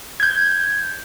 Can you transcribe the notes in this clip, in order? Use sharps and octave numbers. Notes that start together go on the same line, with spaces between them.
G6 G#6